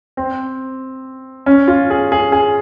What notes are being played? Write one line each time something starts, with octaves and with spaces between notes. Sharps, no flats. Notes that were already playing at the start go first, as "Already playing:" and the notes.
C4
C#4
F4
G#4
G#4
G#4